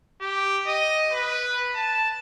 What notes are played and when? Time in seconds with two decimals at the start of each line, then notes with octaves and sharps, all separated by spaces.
0.21 G4
0.67 D#5
1.12 B4
1.75 A5